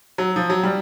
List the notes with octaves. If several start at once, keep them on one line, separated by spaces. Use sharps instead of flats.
F#3
F3
F#3
G3